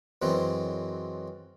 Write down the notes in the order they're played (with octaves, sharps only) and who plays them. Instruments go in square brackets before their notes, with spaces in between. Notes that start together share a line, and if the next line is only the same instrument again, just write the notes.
[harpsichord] F#2 E3 G#3 C4